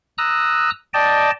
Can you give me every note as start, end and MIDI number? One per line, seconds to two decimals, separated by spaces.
0.18 0.70 82
0.18 0.70 87
0.18 0.70 88
0.18 0.70 90
0.94 1.30 74
0.94 1.30 75
0.94 1.30 79
0.94 1.30 81